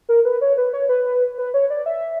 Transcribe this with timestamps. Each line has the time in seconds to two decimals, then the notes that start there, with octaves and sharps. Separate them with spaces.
0.09 A#4
0.25 B4
0.41 C#5
0.58 B4
0.73 C#5
0.89 B4
1.38 B4
1.54 C#5
1.70 D5
1.86 E5